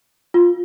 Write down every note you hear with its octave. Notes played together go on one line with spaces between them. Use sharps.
F4